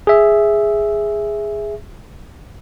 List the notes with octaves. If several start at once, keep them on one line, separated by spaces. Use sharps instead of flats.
G#4 E5